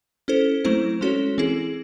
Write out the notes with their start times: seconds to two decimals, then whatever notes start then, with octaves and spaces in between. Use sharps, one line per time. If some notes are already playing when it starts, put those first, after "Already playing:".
0.28 C#4 E4 A4 C5
0.65 F#3 A3 C4 E4 C5
1.01 G#3 C#4 F#4 A4 C#5
1.38 E3 C4 E4 G#4